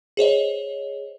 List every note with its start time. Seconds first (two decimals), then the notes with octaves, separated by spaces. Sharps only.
0.17 G#4 C5 C#5 D#5